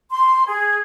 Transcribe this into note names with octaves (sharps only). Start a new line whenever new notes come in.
C6
G#4